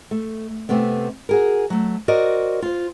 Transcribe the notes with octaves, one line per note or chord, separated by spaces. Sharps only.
A3
C3 A3 B3 C4
F#4 G#4 A#4
F#3 A3
F#4 A#4 C5 D5 D#5
F4 C5